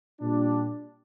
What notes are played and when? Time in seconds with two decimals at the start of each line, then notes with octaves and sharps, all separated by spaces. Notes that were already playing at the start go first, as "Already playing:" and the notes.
0.20 A#2 G3 D4